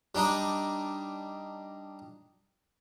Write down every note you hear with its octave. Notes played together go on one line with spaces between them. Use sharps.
G3 D4 D#4 D#5